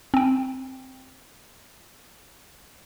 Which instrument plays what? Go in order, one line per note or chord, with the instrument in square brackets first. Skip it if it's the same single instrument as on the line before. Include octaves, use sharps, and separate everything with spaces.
[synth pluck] C4 G5